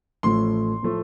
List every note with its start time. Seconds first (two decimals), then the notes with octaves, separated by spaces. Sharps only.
0.23 A1 A2 F3 A3 C6
0.83 A2 F3 A3